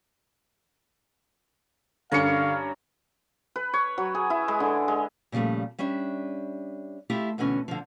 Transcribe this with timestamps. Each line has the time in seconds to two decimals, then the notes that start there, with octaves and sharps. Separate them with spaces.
2.12 G2 D3 C#4 A#4 F5 C#7
3.56 B4
3.74 C#5
3.98 F#3
4.15 G#4
4.30 E4
4.48 G#3
4.60 D3
4.88 G#3
5.32 A#2 C#3 F3 G3 A3
5.79 G3 C#4 D4 E5
7.10 A3 E4 F4 G4 E5
7.38 D2 B2 D3 E3 C#4
7.68 D3 F3